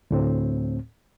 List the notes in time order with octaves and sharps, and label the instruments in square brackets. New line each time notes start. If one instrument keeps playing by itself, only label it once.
[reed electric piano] D2 A2 C4